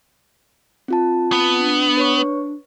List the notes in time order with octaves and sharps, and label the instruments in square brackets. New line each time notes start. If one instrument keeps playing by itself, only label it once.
[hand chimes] C4 F4 A5
[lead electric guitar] B3
[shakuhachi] D4
[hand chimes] B4 C#5 C#6